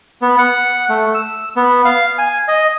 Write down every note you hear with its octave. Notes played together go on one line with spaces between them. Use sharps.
B3
F#5
A3
E6
B3
F5
G#5
D#5